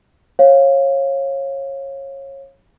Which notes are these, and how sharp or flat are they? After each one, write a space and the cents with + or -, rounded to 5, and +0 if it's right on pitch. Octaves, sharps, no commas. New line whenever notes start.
C#5 -25 F5 +0